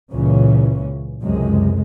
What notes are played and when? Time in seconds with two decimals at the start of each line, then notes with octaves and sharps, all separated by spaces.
0.12 C#2 A#2 C#3 E3 C#4
1.22 C#2 F#2 C3 G#3